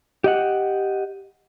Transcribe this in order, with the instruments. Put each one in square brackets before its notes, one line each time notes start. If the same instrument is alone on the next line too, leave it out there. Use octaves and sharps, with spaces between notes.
[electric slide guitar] G4 D#5 F#5